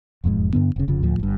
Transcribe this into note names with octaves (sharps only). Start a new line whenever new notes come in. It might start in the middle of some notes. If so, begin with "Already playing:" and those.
E1 F2 G#2 G#3
G2 D3 B3
F1 C#3
F1 F2 C#3 F3
D2 A2 F3
G1 G2